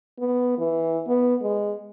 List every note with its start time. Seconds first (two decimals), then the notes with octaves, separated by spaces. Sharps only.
0.19 B3
0.58 E3
1.08 B3
1.42 G#3